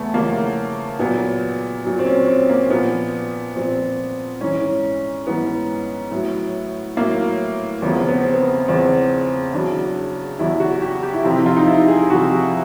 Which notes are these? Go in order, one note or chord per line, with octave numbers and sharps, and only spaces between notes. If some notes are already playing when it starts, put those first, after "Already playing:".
Already playing: E2 C#3 A3 B3
E2 C#3 F3 A#3
A#2 F#3 B3
A#2 F#3
C4
C#4
C4
A#3
A#2 F3 B3
A#2 F3 C4
G#2 E3 C#4
G#2 E3 B3
A2 F#3
A2 F#3 A#3
E2 C#3 F3 B3
C4
B3
C4
B3
E2 C#3 F3 C4
E2 C#3 F#3 D4
E2 C#3 F#3 E4
F#4
G4
G4
E4
F2 C3 E3 F4
F4
D#4
E4
G#4
F2 C3 E3 F#4